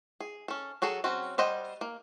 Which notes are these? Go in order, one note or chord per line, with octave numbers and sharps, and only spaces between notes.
G#4
C#4 A4
F#3 F#4 G#4 A4
F#3 C4 C#4 F#4
G3 C5 D#5 F#5 G5
A#3